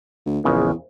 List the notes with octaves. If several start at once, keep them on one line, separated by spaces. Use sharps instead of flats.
D2
A#1 E2 C#3 G#3